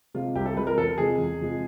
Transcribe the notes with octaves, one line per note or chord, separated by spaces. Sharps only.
C3 F3 G#3 F4
C2 G4
A4
C3 F3 G#3 B4
A#4
E2 A4
C3 F3 G#3 G#4
E2
C3 F3 G#3